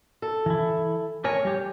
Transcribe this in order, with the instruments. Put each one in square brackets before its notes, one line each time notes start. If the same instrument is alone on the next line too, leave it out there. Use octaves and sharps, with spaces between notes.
[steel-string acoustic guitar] A4
[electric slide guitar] E3 E4
[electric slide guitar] A3 A#4 G#5 [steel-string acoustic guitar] C#5
[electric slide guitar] G3 G4